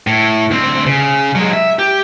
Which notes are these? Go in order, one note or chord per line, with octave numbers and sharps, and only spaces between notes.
A2
D2 C4
C#3
F#3 G#3
E5
G4